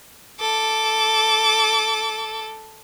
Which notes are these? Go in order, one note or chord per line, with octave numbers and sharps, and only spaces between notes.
A4 D6